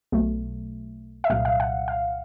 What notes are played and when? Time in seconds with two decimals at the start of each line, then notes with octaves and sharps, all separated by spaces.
0.12 B1 B2 F#3 A3
1.24 E5
1.30 C2 A#2 F#3 F5
1.45 F5
1.60 F#5
1.88 F5